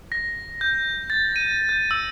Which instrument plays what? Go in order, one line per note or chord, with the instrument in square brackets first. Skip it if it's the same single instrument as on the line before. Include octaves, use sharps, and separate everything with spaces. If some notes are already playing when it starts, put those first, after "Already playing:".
[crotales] A#6
G6
A6
D#7
G6
E6